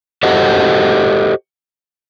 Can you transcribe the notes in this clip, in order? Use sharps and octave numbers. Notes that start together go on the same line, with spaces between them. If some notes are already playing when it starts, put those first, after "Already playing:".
F#4 G4 A4 C5 D#5 F#5